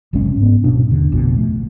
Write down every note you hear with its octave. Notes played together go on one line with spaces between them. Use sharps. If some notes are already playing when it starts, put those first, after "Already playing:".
F#1 C2 G#3 C#4
G#2 B3
D1 B2 D4
D#2 D3
A1 F2 B2
A3